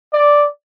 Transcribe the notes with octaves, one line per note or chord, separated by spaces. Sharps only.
D5